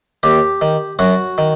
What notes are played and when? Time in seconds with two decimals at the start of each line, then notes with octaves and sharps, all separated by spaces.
0.23 D#2 G4
0.61 D#3
0.99 F#2 F#4
1.38 D#3